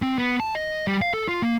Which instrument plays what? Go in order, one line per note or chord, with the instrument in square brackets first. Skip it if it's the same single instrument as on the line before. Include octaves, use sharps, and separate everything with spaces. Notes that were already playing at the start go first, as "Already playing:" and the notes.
[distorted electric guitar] C4
B3
A5
D#5
G3
F5
A4
F4
A#3